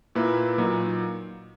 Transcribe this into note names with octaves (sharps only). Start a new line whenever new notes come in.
A#2 A#3 E4 B4
A#2 F#3 A#3 D#4